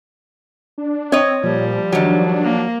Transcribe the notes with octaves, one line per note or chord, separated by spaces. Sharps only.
D4
C4 C#5 D#5
A#2 F3 G3
D#3 F#3 D4
A#3